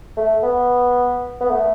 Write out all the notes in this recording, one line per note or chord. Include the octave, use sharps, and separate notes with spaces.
A3
B3
B3
A3